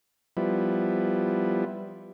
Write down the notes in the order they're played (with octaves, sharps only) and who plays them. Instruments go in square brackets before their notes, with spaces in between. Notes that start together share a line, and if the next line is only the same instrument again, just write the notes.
[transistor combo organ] F3 G3 B3 E4